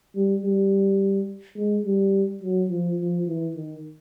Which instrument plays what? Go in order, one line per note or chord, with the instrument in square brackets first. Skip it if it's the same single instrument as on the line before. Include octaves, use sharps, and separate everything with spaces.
[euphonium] G3
G3
G#3
G3
F#3
F3
F3
E3
D#3